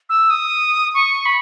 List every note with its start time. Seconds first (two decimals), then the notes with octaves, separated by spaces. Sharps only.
0.09 E6
0.30 D#6
0.94 C#6
1.26 B5